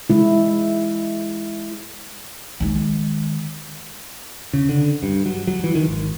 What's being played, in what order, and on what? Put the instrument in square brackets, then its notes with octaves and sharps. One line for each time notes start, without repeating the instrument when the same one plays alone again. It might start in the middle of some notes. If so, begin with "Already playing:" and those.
[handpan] G#3 E4
[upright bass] D#3 G#3
[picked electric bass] C#3
D3
G2
F#3
F#3
E3
D#3
G#1